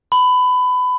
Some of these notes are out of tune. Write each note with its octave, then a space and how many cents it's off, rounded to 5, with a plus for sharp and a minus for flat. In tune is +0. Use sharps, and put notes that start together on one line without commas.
B5 +20